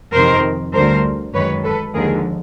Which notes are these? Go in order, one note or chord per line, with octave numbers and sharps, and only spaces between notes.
F2 C3 D#3 A#4 C5
D2 D3 G3 A#4 C5
F#2 D#3 G#3 B4 C#5
A4 B4
D#2 D3 F3 G#3 G#4 A#4